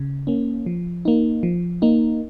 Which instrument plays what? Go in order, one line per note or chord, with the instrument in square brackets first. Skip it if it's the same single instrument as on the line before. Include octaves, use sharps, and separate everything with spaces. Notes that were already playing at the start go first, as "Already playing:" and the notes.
Already playing: [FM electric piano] C#3
A#3 C#4
F3
A#3 D#4
F3
A#3 D#4